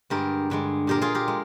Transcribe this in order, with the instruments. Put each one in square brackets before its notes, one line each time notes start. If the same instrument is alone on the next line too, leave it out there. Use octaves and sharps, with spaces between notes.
[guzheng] G2 D3 G#3 G4 A#4
G2 D3 G#3
A#2 G#3 G4 A#4
F4 G#4
G4 A#4
G#3